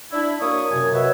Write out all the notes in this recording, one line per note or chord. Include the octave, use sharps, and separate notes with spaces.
D4 E4
A#3 D4 F#4 C#5 C#6 D#6
F#2 C3 G#5
F#4 B4 C#5 D#5 E5